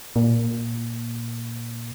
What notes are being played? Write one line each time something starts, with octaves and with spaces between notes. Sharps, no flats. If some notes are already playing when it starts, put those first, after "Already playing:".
A#2